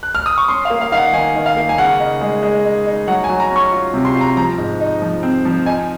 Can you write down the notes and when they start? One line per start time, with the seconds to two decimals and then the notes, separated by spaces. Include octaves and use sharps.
0.03 F#6
0.15 F6
0.26 D#6
0.38 C#6
0.48 C#4 C6
0.65 F5
0.70 A#3
0.81 F5
0.92 D#3 F5
0.97 F#5
1.13 D#3 G#5
1.35 D#3
1.46 F5
1.56 A#3
1.69 G#5
1.78 C#3 F#5
2.00 D#4
2.21 G#3
2.42 G#3
2.65 D#4
2.86 D#4
3.08 F#3 F#5
3.24 G#5
3.29 F#3
3.40 A#5
3.51 C#4 C#6
3.72 F4
3.94 C3
4.05 C6
4.15 F4
4.21 A#5
4.37 F3 A#5
4.58 G#2
4.80 D#4
5.02 F3
5.23 C4
5.45 F3
5.66 D#4 G#5